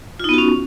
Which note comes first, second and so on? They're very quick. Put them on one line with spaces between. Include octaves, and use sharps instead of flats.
F4 D#4 B3 F#4 C#4